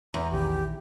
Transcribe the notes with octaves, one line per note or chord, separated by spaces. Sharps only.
E2 A#5
A#1 D#3 G4